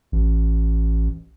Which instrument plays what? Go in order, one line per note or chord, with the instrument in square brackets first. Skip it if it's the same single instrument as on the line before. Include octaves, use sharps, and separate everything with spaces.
[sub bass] A1